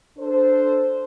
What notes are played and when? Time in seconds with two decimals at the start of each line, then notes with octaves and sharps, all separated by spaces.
0.18 D4 A4 C5